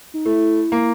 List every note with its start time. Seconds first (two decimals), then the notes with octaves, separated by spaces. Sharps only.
0.14 D#4
0.25 A3 E4
0.72 A#3